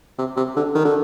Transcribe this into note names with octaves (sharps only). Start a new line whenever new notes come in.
C3
C3
D3
D#3
D3